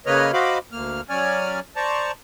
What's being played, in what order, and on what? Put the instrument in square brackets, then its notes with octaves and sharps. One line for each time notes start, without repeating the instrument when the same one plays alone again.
[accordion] C#3 A#3 B4 C#5 D#5 F6
F#4 C5 D#5 F5 B5 D6
D2 A#3 F6
F#3 C#4 C#5 D5 G#5 F6
C5 D5 A5 A#5 C#6